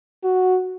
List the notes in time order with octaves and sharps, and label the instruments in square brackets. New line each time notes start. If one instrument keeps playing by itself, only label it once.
[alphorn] F#4